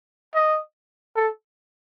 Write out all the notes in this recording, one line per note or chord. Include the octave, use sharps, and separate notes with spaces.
D#5
A4